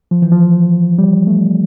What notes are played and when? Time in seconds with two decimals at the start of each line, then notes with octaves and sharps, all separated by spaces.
0.11 F3
0.22 E3
0.32 F3
0.98 G3
1.27 A3